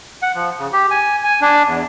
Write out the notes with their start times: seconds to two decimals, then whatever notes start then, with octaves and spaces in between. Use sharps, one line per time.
0.22 F#5
0.35 F3
0.59 C#3
0.73 G4
0.91 G#5
1.23 G#5
1.41 D4
1.67 E2